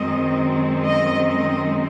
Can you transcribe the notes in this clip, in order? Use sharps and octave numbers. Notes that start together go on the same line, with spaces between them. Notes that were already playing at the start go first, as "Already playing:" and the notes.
Already playing: F#2 D#3 G#3 C4 D#5
D#5
D#5